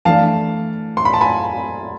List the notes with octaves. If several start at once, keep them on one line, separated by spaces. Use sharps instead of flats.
E3 A3 D4 F5 A5
C6
B5
A5
G#5 B5